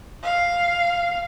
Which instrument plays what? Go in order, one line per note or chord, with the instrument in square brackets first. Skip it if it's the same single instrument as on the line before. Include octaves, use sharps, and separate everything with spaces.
[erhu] F5